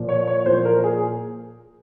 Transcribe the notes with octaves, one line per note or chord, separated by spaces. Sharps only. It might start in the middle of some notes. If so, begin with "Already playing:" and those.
Already playing: A#2 F3
C#5
C#5
A#2 F3 C5
A#4
G#4